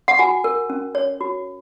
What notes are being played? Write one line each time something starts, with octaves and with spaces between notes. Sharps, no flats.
F#5
F#4 G#5
A#4
C#4
C#5
F#4